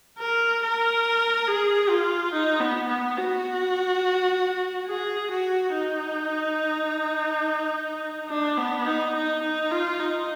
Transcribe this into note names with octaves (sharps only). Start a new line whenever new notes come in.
A#4
A#4
G#4
F4
D#4
B3
B3
F#4
G#4
F#4
D#4
D4
B3
D#4
D#4
D#4
F4
D#4